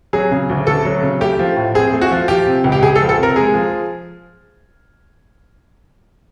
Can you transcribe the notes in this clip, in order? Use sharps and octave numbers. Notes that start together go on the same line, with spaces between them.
F#3 G#4
C#3
D2
D2 A4
F#3
C#3
A3 G4
F3
A2
C4 G#4
A3
F#4
F3
F3 G4
C3
C#2
G4
C#2 G#4
A4
F3
A4
C3 A#4
G#3 G#4
F3